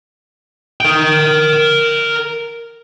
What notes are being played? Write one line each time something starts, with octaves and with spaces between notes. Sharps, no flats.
A#4 G5